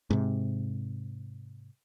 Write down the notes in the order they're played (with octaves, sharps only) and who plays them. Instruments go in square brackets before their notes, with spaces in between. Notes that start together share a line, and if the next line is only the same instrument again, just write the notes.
[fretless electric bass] G#2 C3